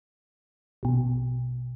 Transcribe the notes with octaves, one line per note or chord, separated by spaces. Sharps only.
A#1 B2